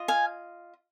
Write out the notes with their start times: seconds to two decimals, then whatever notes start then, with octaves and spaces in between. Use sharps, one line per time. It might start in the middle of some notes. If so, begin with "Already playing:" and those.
Already playing: F4 D#5
0.08 F5 G#5